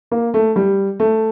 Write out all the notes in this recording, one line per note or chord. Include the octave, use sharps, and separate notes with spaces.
A#3
A3
G3
A3